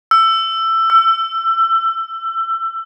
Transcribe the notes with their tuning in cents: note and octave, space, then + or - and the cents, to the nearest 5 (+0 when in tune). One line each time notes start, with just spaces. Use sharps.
E6 +15
E6 +25